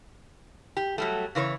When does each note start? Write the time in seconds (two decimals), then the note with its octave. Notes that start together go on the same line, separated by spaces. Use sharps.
0.77 G4
0.98 F#3 G3 A3
1.35 C#3 E3 C5 C#5